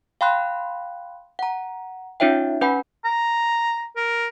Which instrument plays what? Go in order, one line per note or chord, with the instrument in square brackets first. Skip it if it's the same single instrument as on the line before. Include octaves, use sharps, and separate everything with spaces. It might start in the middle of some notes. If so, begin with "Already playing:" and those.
[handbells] F5 G5 B5 C6 F#6
F#5 A#5
C#4 D#4 F4 C#5 E5 G5
C#4 B4 F#5 G#5 B5
[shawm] A#5
A#4